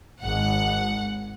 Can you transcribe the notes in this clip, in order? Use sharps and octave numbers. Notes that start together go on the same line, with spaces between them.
G#1 F#5